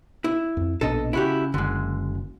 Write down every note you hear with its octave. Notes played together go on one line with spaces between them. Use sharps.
E4
F2
A#1 B2 D4 A4 D#5
C#3 E4 F#4 G4
F#1 D3 G#3